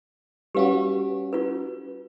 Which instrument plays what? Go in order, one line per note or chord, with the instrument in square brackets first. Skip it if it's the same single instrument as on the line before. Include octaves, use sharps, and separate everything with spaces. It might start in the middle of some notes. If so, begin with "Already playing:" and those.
[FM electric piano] G3 C#4 F#4 [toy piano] G4 B4 F5
[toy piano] F4 B4